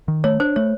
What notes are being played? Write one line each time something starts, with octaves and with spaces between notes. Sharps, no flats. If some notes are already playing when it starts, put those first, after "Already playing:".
D#3
A3 C#5
D4 C5
A3 C#5